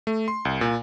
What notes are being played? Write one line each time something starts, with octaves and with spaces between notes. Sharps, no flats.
A3
C6
C2
A#2